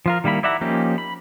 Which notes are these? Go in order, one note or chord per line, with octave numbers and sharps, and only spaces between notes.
F3 F4 A#4
D#3 G3 A#3 E4 B5
E4 D5 E5 F#5 A#5
F3 A#3 C#4 D#4 G4
B5